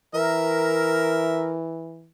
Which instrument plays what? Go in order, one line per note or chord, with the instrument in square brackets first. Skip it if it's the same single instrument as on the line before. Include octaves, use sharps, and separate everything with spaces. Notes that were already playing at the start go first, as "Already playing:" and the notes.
[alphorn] E3 [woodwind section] A#4 [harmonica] E5